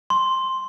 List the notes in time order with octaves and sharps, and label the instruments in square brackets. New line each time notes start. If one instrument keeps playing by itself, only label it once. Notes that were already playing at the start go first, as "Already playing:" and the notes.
[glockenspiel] C6